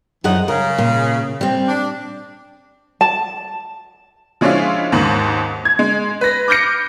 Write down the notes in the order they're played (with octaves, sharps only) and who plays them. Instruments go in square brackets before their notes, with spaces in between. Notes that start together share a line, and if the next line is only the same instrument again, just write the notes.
[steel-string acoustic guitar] F#2 G#4 F#5 [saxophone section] E3 F3 D#4
[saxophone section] C#3 [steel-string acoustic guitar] A#4
[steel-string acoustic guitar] A#2
G3 C4
[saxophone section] D4
[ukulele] A5
[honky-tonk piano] F3 G#3 C#4 D4 E4 F4
D#2 G#2 F#7
G#6
G#3
B4 A#6
D6 F6 G6 A#6 C#7